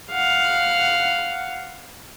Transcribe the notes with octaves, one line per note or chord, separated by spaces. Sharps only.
F5 F#5